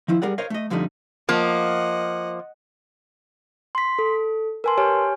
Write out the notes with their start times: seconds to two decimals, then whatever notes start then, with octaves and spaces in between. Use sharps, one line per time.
0.08 D#3 F3 E4
0.22 G3 G#4 A#4 D5 F#5
0.38 A#4 C5 C#5 D#5 F5
0.50 A3 D#5
0.70 F2 D3 F3 G3 A3 D#4
1.29 F3 A#3 D#5 F#5
3.75 C6 B6
3.99 A4
4.64 A#4 B4 G#5 A5 C6
4.77 G4 C#5 G#5 F6